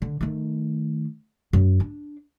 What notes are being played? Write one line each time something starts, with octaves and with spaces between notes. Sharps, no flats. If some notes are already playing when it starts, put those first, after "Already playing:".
D3
D#3 A3
F#2
D4